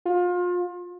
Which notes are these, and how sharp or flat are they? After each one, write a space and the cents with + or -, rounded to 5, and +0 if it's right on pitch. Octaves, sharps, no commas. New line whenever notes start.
F4 +30